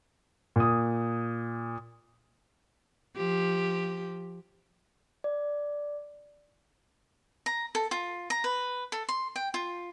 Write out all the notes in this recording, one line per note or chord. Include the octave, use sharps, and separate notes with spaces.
A#2 D#6
F3 G4
D5
A#5
A4
F4
A#5
B4
A4
C6
G5
F4